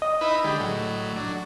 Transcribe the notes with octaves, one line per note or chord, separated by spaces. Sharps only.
D#5
D#4 E4 B4
D3 G#3 G4
A2 F#3
F#3 D4